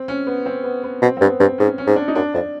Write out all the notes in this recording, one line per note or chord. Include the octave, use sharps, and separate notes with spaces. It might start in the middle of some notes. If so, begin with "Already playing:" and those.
Already playing: C4
C#4
B3
C4
B3
B3
B2 C4
C4
G2 B3
G2 C4
G#2 C#4
C#4
G#2
D4
D#4
F#2 D4
F2 D4